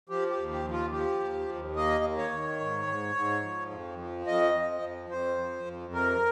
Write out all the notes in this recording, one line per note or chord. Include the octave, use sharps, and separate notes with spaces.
F3 G4
G4
D#2
G4
F3
F4
F3 G4
D#2
D#2
A#3 D#5
D#3
C#5
D#3
G#2
G#2
G#2
F3
F2
F3
F2 D#5
F3
F2
F2 C5
F3
F2
C3 A#4